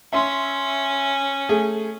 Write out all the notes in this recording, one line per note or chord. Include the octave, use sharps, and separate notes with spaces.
C#4 E5 C6
A3 G#4